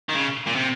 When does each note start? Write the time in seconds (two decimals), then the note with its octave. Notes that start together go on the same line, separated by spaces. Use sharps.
0.09 D#3
0.15 C#3
0.46 A#2
0.55 C3